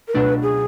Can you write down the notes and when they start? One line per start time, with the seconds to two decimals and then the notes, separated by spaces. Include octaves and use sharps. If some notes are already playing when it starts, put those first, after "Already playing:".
0.08 A#4
0.14 C#2 B2 F#3 A3 D4 B4
0.43 G#4